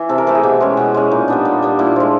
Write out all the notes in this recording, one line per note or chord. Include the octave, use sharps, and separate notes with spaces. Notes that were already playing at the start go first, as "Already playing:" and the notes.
Already playing: E3
C3 A4
A#4
E3 A3 A4
G#4
B2 G4
G#3 C#4
B2
G#3 C#4
A#2 D#4
G3 B3 D4
A#2
G3 B3 D4
A#2 E4
F3 G#3